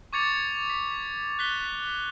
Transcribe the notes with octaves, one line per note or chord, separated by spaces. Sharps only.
C#6 D6 G#6 A6 C#7 F7
B6
F#6 B6 G7